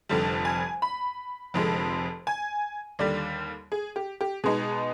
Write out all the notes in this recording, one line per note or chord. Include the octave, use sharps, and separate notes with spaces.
F1 F2 D3 G3
G#5
B5
F1 F2 D3 G#3
G#5
D#2 D3 G3 D5
G#4
G4
G4
B2 G#3 B3 D#4 G#4